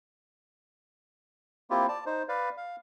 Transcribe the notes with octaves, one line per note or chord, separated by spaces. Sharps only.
A#3 C4 E4 F4 G4
D5 A5
D#4 C5
B4 D5 F5
F5